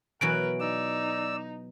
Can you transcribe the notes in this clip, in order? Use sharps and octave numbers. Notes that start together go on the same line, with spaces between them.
B2 E3 F#3 A#4 B4 D7
D#4 D5 E6